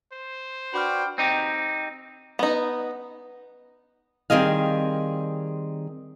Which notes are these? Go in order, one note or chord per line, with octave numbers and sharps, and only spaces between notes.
C5
D4 F#4 B4 G5 B5 D6 F6
C4 D#4 G4
B3 D#4
D#3 G3 C4 G#4 D#5 F5